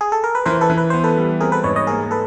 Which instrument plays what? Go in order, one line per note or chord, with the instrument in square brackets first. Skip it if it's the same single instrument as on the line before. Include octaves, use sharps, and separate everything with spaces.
[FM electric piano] G#4
A4
A#4
B4
[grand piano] E3 [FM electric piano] A#4 C5
[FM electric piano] A4 B4
[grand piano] E3
[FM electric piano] B4
[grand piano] B3 [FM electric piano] C5
[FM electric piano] A4 B4
[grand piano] G3
[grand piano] C4 [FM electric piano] G#4 A#4
[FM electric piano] A4 B4
[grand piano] G#2 [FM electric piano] B4 C#5
[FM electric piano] C#5 D#5
[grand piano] A#3 [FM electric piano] G#4 A#4
[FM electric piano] A4 B4